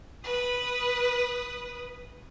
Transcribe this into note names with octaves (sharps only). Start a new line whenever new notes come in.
B4 D#6